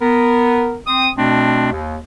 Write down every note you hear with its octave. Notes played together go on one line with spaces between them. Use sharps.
B3 A#4
C4 D#6
B2 A3 C4 D4
D#2